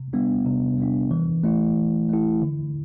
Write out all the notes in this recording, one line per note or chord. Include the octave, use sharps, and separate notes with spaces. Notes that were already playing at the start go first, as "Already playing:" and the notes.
Already playing: C3
G3 B3 D4
C3
G3 B3 D4
E3
A3 E4
E3
A3 E4
D3